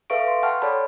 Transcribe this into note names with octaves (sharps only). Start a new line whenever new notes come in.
A4 B4 E5 F5 C#6 D7
C6
F#5 G5 A5 C6 C#6 F6
A4 C#5 D5 A5 B5